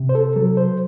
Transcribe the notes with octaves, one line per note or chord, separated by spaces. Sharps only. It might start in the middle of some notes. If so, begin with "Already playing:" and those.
Already playing: C3
C5
A4
F#3 A4
C5